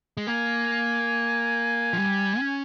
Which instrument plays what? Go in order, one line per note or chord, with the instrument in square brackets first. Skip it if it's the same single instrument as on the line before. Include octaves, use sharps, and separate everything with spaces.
[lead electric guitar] G#3
[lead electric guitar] A#3 [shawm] G#5
[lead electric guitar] F3
G3
C#4